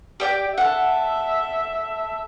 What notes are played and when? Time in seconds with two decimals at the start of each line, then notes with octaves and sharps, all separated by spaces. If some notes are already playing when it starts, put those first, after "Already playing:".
0.20 G4 D5 G5
0.58 A4 E5 F#5